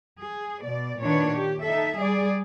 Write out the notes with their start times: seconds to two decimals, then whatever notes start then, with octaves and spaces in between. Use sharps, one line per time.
0.21 G#4
0.61 B2 D5
1.00 A#2 D#3 D4 B4 C#5
1.32 G4
1.62 D#4 A4 E5
1.99 G3 G#4 D5